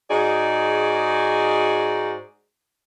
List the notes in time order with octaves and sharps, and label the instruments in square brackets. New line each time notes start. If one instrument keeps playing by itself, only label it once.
[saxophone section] G#2 D#4 F#4 G#4 D5